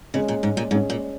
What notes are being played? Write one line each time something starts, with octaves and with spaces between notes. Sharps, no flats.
C#3 G#3 C#4 G#4 C#5
A#2
G#2
A#2
G#2 G#3 C#4 G#4 C#5
A#2